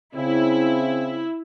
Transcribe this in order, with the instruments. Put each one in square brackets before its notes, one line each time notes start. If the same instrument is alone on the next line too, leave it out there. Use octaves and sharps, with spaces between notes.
[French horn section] C#3 C4 [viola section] E4